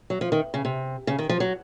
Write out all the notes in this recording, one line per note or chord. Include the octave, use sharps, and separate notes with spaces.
F#3
F3
D#3
C#3
C3
C#3
D#3
F3
F#3